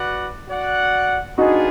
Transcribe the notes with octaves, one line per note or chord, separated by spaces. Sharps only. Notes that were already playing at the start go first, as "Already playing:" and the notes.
Already playing: F#4 B4 D5 F#5
F#4 D5 F#5
B3 D4 D#4 F4 F#4 G#4